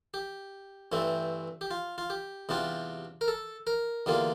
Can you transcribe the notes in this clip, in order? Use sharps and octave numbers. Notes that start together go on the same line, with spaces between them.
G4
G2 E3 A3 C4
G4
F4
F4
G4
E2 C3 G3 D4 F4
A#4
A4
A#4
E2 D3 G3 A#3 F4